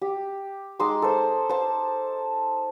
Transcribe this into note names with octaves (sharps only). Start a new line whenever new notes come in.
G4
G#3 D#4 C6 D6
A4 C5
C5 A5